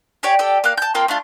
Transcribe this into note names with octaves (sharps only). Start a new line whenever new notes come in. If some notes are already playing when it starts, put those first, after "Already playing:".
G4 C#5 D5 G#5
G4 A4 D5 G5
A#3 F5 F#6
A5 G6
A#3 C4 F4 G5
A3 D4 F4